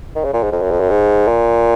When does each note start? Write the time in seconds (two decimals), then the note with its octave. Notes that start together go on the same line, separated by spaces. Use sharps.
0.16 D#3
0.24 C#3
0.33 A#2
0.43 G#2
0.52 F2
0.62 F#2
0.71 F2
0.80 F#2
0.90 G#2
1.27 A#2